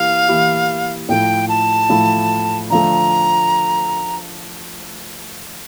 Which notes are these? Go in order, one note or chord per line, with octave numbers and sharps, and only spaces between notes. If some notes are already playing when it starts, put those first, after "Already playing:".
Already playing: E3 A#3 E4 G4 F5
E3 A#3 E4 G4
A2 F3 A3 E4 G5
A5
A2 F3 A3 E4
D3 F3 A3 A#5